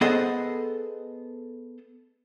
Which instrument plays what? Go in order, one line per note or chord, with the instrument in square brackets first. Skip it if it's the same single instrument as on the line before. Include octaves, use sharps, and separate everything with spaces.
[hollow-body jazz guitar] B3 G#4 A4 C5 D#5 F#5